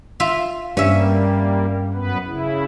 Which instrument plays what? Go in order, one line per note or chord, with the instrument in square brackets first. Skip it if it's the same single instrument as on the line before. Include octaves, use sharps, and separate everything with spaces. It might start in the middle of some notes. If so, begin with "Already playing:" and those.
[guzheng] F4 E5
[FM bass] G2 [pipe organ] G3 A#3 [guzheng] C#4 E5
[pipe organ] F#2 B3 B4
C#3 E4